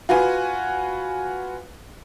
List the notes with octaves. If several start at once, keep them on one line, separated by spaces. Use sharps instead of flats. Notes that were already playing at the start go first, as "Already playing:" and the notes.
F4 F#4 B4 G#5